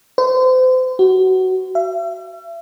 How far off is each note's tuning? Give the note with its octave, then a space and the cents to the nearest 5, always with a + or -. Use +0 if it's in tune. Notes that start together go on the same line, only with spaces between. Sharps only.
C5 -35
F#4 +20
E5 +40